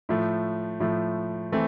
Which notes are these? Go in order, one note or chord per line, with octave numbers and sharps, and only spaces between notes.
A2 F3 A3
A2 F3 A3
E3 A3 C4